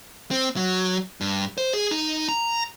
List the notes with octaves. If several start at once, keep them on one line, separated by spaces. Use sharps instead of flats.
C4
F#3
G2
C5
G#4
D#4
A#5